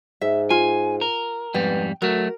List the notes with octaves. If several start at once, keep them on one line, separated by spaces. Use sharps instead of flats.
G#2 E5
F4 G#5
A#4
F2 G#2 G3 B3 G5
F#3 A3 F#4 A#4